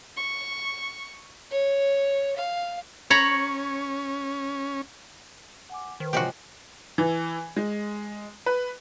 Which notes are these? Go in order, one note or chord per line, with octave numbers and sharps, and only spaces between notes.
C#6
C#5
F5
C#4 C#5 A#5 B5
F#5 G#5 D6
D#3 B4 C5
G#2 C3 F3 F#4 G4 C#5 G#5 C6
E3
G#3
B4